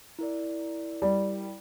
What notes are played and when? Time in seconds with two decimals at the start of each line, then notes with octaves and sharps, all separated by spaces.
0.19 E4 A#4 D5
1.02 G3